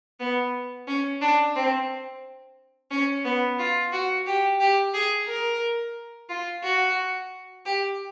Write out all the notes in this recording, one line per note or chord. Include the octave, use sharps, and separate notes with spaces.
B3
C#4
D4
C4
C#4
B3
F4
F#4
G4
G4
G#4
A#4
F4
F#4
G4